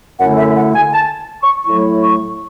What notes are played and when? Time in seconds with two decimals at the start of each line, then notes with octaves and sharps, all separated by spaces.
0.20 F#2 D3 A3 E4 F#5
0.39 E5
0.57 F#5
0.75 G#5
0.93 A5
1.43 C#6
1.66 A2 F#3 A3 E4 C#6
2.03 C#6